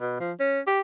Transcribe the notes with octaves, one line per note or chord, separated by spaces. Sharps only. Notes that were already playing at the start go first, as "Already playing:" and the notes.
B2
F3
C#4
G4